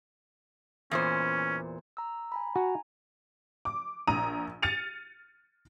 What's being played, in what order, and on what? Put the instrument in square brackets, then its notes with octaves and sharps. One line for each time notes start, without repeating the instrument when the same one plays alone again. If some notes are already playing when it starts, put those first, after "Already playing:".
[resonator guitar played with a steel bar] E2 A#2 C5 [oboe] C#4
[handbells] A#5 E6
G#5 A#5 B5
[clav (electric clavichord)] F#4 [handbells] G#5 A#5
[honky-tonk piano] D6
A#1 A#5 D#6 D#7
F6 A6 C#7 D#7 F7